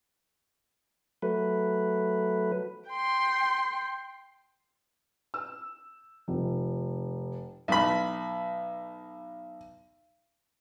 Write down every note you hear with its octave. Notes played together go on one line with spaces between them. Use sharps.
F#3 A3 B4
G5 C6
E6
F1
B1 B5